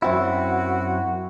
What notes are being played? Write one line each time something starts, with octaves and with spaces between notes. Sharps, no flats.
F#2 C4 E4 F#4